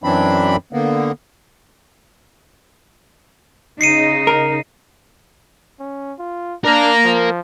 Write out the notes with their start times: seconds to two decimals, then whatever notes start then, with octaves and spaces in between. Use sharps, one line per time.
0.04 F#2 E3 F#3 C4 D4 B5
0.73 D3 A#3 B3
3.81 C#3 D#4 C7 C#7 D#7
4.27 A#4
5.80 C#4
6.19 F4
6.65 D4 A#4 F5 A#5
7.04 F3